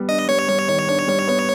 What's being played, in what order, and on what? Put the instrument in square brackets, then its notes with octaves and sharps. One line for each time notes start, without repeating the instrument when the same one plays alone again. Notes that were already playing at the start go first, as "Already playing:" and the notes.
Already playing: [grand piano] G3 B3
[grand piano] D4 [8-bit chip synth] D#5
[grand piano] G3 [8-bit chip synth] C#5
[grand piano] G3
D#3
D4
G3
B3